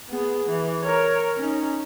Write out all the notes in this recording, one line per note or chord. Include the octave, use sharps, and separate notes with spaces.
B3 G#4
E3
A#4 C#5
C#4 D#4